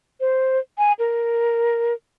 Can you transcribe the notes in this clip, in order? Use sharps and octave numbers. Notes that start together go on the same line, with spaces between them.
C5
G#5
A#4